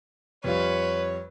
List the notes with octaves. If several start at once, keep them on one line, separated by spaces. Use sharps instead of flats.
F2 G3 F4 B4 C#5